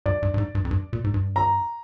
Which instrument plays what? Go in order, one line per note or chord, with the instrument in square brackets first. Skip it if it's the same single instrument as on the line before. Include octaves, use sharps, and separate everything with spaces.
[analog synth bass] G2 [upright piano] D5
[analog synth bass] G2
G2
G#2
G2
F2
G2
A#2
G#2
G2
[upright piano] A#5